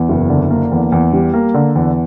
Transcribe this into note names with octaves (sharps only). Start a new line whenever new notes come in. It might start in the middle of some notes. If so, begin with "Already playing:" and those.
Already playing: E2
F#1
D3
A#3
E2
E2
G3
A#3
D3
E2